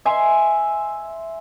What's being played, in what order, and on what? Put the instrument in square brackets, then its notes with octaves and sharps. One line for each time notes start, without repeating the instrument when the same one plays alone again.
[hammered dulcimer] E5 G#5 C6